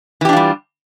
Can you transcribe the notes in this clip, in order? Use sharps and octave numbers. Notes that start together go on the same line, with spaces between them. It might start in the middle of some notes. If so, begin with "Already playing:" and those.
E3 G3 D4 F4 G4